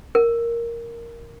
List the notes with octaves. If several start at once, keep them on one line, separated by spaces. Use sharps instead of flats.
A#4